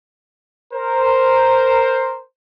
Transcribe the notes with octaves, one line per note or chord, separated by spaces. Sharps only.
A#4 C5